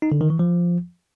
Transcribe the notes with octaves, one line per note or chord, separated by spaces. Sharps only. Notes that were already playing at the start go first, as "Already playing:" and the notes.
D#4
D3
D#3
E3
F3